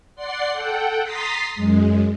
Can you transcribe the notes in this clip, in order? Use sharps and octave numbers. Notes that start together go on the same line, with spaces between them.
D5 F#5 C6 C7
A4 F#5 G5
A#5 C6 D#6 A6 B6 C7
F#2 G#3